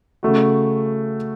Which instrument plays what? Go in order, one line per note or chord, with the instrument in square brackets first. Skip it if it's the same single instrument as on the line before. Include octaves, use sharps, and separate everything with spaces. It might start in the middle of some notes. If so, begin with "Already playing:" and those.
[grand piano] C#3 A3 F#4